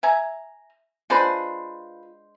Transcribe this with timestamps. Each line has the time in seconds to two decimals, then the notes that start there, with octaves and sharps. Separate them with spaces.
0.03 E5 G#5 A#5
1.10 G#3 D4 F4 B4 C5 B5